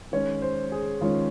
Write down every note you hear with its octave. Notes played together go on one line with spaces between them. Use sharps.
D#3 G#3 C#4 C#5
C5
G#4
D#3 G#3 C#4 F4